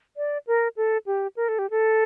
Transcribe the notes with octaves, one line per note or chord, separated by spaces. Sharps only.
D5
A#4
A4
G4
A#4
A4
G4
A4